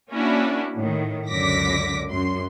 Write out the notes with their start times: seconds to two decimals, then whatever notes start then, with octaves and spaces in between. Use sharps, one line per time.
0.11 A#3 C#4 D4 E4 F#4
0.76 A2 D#3
1.29 C#2 F#2 D3 D6 A#6 B6
2.10 F#2 C6